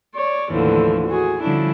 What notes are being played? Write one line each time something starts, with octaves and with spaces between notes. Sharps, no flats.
C#5 D5
D#2 A2 D3 E3 F3
F#4 G#4
D3 F3 G3 C#4 D4 E4